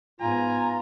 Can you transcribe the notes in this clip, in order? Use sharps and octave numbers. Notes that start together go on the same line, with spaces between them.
G#2 B3 F4 G#5 A#5